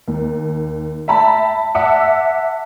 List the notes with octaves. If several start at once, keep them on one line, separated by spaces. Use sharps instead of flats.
D#2
E5 G5 A5 B5
E5 F#5 A5 D6 E6 C#7